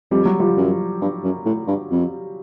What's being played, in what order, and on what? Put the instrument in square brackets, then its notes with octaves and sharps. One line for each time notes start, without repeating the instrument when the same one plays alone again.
[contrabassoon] F2 [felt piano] G3
[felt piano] F#3
F3 G3
[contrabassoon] F#2
G2
F#2
A2
G2
F2